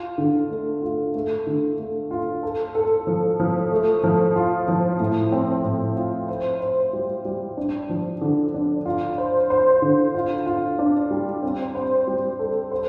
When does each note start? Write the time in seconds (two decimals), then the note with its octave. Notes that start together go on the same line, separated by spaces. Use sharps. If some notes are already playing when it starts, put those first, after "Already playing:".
Already playing: F4
0.18 D3
0.50 A3
0.82 F4
1.15 A3
1.46 D3
1.79 A3
2.11 F4
2.43 A4
2.75 A4
3.07 F3
3.40 F3
3.72 A3
4.04 F3
4.36 F4
4.68 F3
5.00 A2
5.32 C4
5.65 A2
5.96 F4
6.28 C5
6.60 C5
6.93 G3
7.25 G3
7.57 D4
7.89 F3
8.21 D3
8.54 D4
8.85 F4
9.18 C5
9.50 C5
9.82 D3
10.14 F4
10.46 F4
10.79 D4
11.11 G3
11.42 C4
11.75 C5
12.07 G3
12.39 A4
12.71 C5